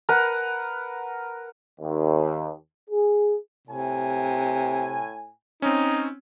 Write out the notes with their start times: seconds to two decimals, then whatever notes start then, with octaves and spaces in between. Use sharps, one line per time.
0.09 A#4 B4 F#5
1.81 D#2
2.90 G#4
3.67 A2 C3 G#5
5.62 C4 C#4 D#4